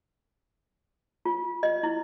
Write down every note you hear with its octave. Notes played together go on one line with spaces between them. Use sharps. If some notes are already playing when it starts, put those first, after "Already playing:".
F4
D#5
E4